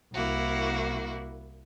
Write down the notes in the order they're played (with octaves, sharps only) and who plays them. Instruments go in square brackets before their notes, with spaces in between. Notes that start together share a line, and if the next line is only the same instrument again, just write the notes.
[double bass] C2 [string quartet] A#3 E4 F#4